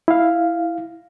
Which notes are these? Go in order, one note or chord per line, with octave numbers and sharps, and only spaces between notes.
E4 F5